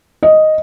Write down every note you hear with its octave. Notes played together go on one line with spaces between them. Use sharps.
D#5